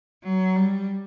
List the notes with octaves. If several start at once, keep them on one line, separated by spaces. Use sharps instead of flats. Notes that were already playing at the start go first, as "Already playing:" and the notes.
F#3
G3